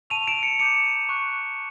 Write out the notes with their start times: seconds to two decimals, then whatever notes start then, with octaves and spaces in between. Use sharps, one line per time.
0.10 A5 C#6 E6 D#7 F7
0.28 D7 E7
0.43 C#7 D#7
0.59 A#5 D6 G6 C#7 D#7
1.09 C#6 F#6